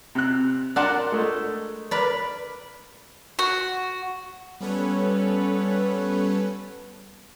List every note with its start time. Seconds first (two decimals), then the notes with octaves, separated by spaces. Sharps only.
0.15 C3 F#6
0.76 D4 A#4 D5 F#5 A5 C6
1.12 G#3 A3
1.91 A#4 B4 D5
3.39 F#4
4.61 G3 B3 C#4 A4 B4 C#5